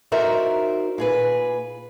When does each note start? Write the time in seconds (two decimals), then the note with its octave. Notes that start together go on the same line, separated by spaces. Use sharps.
0.12 D#4 F#4 A#4 C5 D5 E5
0.98 A#2 G#4 B4